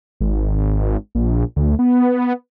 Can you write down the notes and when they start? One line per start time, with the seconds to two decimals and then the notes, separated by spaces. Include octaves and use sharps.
0.21 G#1
1.15 A#1
1.56 D2
1.79 B3